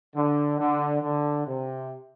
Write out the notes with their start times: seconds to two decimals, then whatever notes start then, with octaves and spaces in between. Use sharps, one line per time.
0.16 D3
0.59 D3
1.02 D3
1.47 C3